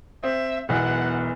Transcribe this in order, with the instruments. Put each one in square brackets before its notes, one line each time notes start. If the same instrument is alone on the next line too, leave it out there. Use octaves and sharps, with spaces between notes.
[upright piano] C4 [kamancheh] E5
[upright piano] E1 B1 E3 [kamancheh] F#5